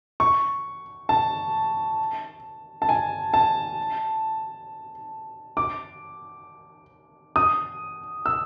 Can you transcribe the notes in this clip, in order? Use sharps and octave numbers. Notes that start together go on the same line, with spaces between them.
C#6
A5
A5
G#5
A5
D6
D#6
E6